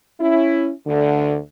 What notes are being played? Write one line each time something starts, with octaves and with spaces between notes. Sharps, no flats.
C#4 E4
D2 D3